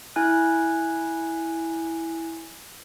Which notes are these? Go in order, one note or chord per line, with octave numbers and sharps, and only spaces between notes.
E4 G#5 F#6